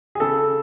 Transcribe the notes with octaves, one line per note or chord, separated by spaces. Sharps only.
G#4
C#3 A4